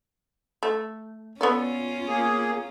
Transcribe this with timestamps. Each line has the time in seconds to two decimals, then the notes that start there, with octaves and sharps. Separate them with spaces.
0.63 A3
1.41 B3 C#4 F4 A4 D5
2.08 A#3 G#4